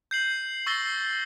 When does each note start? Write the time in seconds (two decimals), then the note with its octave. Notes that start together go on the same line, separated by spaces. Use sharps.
0.11 G6 C7 F#7
0.66 C#6 E6 A6 A#6 C7 G7